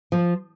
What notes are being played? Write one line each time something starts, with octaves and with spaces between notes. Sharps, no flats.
F3